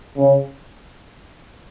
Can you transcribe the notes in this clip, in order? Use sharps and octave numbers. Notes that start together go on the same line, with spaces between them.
C#3